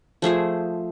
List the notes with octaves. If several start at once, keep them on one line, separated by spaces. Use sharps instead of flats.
F3 A3 G#4 C5